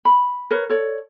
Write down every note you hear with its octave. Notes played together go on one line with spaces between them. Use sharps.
B5
A#4 B4 C#5
A4 C#5 D5